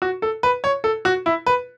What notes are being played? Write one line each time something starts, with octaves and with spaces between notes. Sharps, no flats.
F#4
A4
B4
C#5
A4
F#4
E4
B4